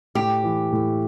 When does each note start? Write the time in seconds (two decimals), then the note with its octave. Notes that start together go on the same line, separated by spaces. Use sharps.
0.15 A2 G4
0.44 E3
0.72 A2